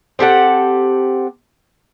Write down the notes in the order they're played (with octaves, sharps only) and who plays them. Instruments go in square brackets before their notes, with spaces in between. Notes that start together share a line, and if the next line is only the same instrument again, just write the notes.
[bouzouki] C4 G4 A4 F#5